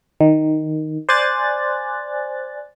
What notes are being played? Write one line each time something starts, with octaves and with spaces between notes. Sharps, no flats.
D#3
C5 D5 G#5 F#6 A6